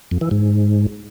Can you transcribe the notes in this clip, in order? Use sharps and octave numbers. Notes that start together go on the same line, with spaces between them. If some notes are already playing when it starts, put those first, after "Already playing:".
F2
E3
G#2